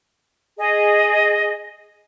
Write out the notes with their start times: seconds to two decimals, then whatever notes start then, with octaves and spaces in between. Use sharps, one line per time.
0.58 G#4 D#5